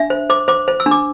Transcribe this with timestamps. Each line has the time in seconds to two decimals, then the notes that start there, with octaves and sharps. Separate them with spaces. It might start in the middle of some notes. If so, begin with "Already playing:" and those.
Already playing: D4 E5
0.10 C5
0.29 C5 D6
0.48 C5 D6
0.68 C5
0.80 E6
0.86 D4
0.91 D6